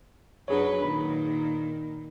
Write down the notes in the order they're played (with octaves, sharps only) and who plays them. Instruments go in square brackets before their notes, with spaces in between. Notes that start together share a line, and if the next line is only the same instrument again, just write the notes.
[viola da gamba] F#2 F#3 B4 [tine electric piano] D4 G#4 C#5
[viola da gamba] A#2 D#3 [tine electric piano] B5